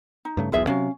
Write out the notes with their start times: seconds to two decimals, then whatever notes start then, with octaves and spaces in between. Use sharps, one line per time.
0.25 D#4
0.37 G2 C#3 A3
0.52 E1 B1 E2 F4 G#4 E5
0.67 C3 F#3 C#4 F5